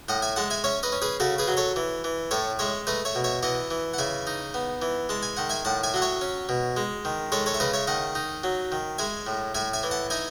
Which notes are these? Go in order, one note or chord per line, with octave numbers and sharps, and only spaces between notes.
A2 D#5 F#5
E5 G#5
G#3 F#5 A5
E5 G#5
C#4 C#5 E5
B4 D#5
C#4
G#4 B4
C#3 F#4 A4
G#4 B4
F#3
A4 C#5
E3
E3
A2 A4 C#5
G#3 C#5 E5
A3 B4 D#5
C#5 E5
B2
C#5 E5
E3 D#5 F#5
E3
F#5
C#3 E5 G#5
D#4
B3
E3
G#3 A5
G#5
D#3 F#5
E5 G#5
A2 F#5 A5
E5 G#5
F#3 F#5
C#5 E5
C#4
B2
G#3
D#3
G#3 A4 C#5
A4 C#5
E5
C#3 B4 D#5
C#5 E5
D#3 D#5 F#5
D#4
F#3
D#3
G#3 E5 G#5
A2
A2 E5 G#5
E5 G#5
E3
F#5 A5
D#4 E5 G#5